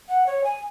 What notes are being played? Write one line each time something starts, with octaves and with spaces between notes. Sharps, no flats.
F#5
C#5
G#5